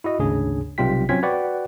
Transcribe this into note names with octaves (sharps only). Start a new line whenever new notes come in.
E4 F#4 D#5
G#1 D2 C#3 D4 G#4
B1 C3 G3 F4 G5 B6
F#3 C4 C#4 F4 G#6 B6
F#4 B4 D5 F#5 G5